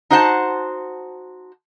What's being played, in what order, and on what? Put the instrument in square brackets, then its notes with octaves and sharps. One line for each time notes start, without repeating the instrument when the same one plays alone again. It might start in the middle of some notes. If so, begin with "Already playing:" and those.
[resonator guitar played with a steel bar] D#4 F#4 C5 F#5 G5 A5